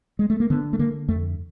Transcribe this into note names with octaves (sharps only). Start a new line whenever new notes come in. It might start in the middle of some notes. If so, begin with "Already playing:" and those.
G#3
A3
A#3
D3 B3
A3
D3 A#3
F2 A3